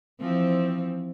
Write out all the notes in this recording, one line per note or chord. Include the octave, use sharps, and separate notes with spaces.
E3 F3 C4